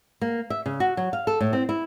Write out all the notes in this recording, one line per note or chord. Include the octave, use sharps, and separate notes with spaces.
A#3
E5
C#3
F#4
F#3
F5
A4
A2
C4
E4